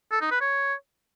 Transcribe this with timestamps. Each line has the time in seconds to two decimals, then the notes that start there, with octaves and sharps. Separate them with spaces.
0.11 A4
0.21 D#4
0.31 B4
0.41 C#5